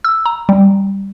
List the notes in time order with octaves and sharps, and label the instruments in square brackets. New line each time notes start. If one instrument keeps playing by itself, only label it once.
[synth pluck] E6
A#5
G3